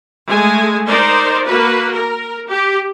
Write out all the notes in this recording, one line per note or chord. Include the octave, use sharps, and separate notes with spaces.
G#3 A3 G#5
D#4 A#4 C5 D5
A#3 F#4 B4
A#4
G4